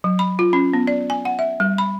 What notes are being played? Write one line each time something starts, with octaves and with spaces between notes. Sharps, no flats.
F#3
B5
F4
C#4
B3
D5
G#5
F#5
E5
G3
B5